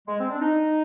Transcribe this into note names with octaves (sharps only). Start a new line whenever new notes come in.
G#3
C4
D4
D#4